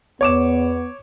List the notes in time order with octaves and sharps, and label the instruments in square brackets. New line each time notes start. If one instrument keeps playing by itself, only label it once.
[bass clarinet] E2 [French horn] B3 [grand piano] C#5 D6 E7